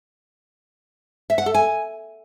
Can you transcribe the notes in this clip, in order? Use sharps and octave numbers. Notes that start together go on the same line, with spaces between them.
E5
F#5
A4
G#5